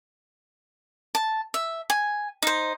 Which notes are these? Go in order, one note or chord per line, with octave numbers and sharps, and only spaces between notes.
A5
E5
G#5
D#4 C5